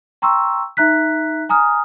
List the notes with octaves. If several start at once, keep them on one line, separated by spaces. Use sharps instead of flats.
G5 A#5 C6 C#6 E6
D#4 E5 A#5 F#6 B6
G#5 A#5 D#6 F6